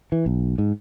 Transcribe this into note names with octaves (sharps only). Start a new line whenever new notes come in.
E3
B1
G#2